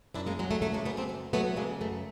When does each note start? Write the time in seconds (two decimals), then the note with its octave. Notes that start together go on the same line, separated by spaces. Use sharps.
0.14 F#2 D4 E4
0.26 G#3 A#3
0.39 F#3 G#3
0.51 A3
0.62 C#3 A3
0.74 G#3 A#3
0.85 F#2 A3 B3
0.97 A#3 C4
1.09 F#2
1.33 F#3 A3 B3
1.56 C#3 G#3 A#3
1.81 F#2 A3